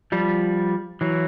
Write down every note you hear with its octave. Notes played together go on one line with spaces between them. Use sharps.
F3 G3
E3 F#3